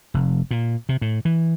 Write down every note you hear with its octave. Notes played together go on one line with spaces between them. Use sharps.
F1
A#2
C3
A2
E3